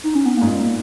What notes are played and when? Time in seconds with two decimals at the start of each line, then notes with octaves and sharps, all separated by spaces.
0.04 D#4
0.15 C#4
0.26 B3
0.37 G#2 A#3
0.46 A#2 G#3